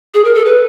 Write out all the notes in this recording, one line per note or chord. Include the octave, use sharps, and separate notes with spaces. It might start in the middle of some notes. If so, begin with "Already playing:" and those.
G#4
A#4
A4
B4